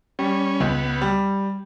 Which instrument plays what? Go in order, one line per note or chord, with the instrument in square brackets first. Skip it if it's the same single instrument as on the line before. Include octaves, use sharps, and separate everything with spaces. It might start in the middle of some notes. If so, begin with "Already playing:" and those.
[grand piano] G3 [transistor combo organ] C#4
[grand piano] C#2 [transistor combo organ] B3
[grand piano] G3